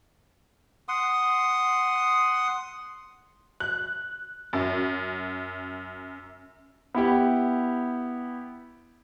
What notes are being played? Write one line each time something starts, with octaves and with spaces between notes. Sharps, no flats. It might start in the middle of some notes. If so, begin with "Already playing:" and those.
F#5 C6 D#6
F#6
F#2
B3 E4 G4